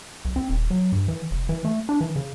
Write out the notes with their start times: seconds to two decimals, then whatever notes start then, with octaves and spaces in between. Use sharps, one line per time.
0.25 B1
0.36 C4
0.50 D#1
0.70 F#3
0.92 G2
1.08 E3
1.31 F1
1.49 E3
1.65 A3
1.89 D4
2.01 E3
2.16 C#3